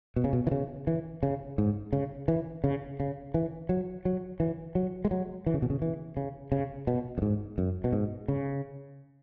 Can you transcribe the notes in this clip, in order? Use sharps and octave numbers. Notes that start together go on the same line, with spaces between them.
B2
C#3
B2
E3
C#3
E3
C#3
G#2
C#3
E3
C#3
C#3
E3
F#3
F#3
E3
F#3
G#3
F#3
E3
C#3
B2
C#3
E3
C#3
C#3
B2
F#2
G#2
F#2
B2
G#2
C#3